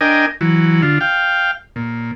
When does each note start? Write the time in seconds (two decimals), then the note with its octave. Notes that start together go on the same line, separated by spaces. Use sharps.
0.01 D4 A#4 D#5 G5 G#5
0.41 E3 F#3
0.82 D3 F4
1.01 F5 G5
1.76 A#2